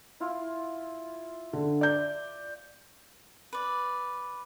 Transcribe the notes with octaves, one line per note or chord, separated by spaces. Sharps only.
E4 F4
D3
D5 G6
B4 D5